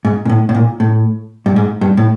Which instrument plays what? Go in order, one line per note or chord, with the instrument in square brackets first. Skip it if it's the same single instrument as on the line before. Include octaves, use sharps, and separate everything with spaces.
[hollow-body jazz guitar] G#2
A#2
A2
A2
A#2
A2
G2
G#2
G2
A2